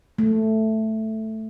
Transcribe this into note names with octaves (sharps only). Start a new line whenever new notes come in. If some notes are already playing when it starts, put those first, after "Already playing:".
A3